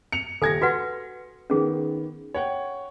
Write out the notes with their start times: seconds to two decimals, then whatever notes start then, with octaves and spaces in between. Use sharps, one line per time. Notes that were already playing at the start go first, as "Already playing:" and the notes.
0.12 C#7 F7
0.42 D#1 A4 G#5 G#6 A#6
0.62 F#4 B4 F#5 C6
1.50 D#3 B3 C#4 G#4
2.34 C#5 F#5 G5